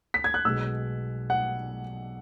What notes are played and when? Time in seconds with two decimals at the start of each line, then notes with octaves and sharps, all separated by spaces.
0.14 B6
0.24 G#6
0.34 F#6
0.45 B1 B2 G#3 E6
1.30 F#5